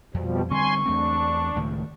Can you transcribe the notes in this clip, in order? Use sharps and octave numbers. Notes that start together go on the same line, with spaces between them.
F2 B2 F3 G3
D3 G3 C4 G#5 C6 C#6
E2 A3 C4 D4
C#2 A2 D#3